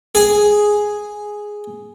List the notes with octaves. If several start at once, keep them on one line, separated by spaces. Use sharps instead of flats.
G#4 G#5